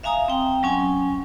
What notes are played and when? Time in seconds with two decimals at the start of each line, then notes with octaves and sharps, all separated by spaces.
0.03 E5 F5 G#5 A#5 D#6
0.28 C4 G5
0.63 F#3 C#4 G#5